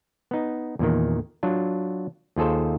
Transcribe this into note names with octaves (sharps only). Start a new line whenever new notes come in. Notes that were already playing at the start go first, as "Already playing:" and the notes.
B3 D#4
E2 A#2 D#3
F#3 D4 F4
D#2 F4 G#4 A4 C5